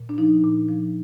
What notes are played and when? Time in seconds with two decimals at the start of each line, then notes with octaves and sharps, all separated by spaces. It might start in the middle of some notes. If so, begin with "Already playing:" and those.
Already playing: A#2
0.09 D4
0.18 F3 D#4
0.44 A#2
0.68 F3